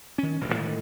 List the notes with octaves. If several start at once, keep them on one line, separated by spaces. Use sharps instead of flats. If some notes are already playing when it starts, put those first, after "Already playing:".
D#3 C#4
E1 A1 D2
A2 D3 D#3 G#3